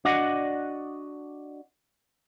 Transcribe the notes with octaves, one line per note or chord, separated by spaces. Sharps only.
D4 F#4 D5 D#5 F#5